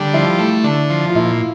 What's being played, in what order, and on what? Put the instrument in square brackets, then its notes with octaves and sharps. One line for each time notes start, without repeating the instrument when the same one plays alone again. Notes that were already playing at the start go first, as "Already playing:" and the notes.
Already playing: [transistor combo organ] D3 G3
[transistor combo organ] F3 [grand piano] E4
[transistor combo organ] A3
D3
F3
[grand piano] F4
[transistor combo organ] A#2 [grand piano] E4